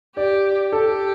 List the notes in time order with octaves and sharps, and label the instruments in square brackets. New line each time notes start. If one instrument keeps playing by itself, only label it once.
[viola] G4 [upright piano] D5
[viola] G4 [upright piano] A4